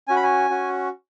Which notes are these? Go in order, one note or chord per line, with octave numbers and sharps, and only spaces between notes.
C#4 F#4 G#5
B5
G#5
C#4 F#4